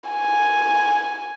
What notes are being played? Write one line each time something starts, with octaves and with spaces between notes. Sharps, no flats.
G#5